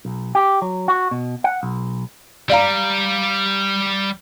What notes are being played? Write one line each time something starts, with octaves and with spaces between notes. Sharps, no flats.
B1
G4
F#3
F#4
B2
F#5
B1
G3 D5 F5 A#5